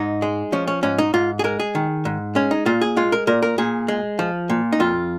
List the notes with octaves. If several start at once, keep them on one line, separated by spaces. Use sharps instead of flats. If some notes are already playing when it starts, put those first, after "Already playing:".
Already playing: G#2 D#4
G#3
F3 C#4
C#4
G#2 C#4
D#4
G#2 F4
G#4
G#3 A#4
G#4
D#3
G#2
G#3 C#4
D#4
A#2 F4
G#4
G#3 F4
A#4
A#2 A#4
A#4
A#2 G#4
G#3
F3
A#2
D#4
F2 F4